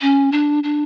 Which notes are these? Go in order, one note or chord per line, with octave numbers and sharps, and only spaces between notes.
C#4
D4
D4